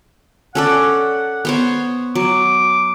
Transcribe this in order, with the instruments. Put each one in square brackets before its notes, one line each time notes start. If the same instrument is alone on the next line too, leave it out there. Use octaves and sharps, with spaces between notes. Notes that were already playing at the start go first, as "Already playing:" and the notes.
[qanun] C#4 A4 D5 [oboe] F#5
[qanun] B3 C5 C#5
[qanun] F#3 [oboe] D6